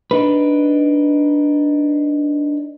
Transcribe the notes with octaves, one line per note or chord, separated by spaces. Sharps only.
D4 D#4 B4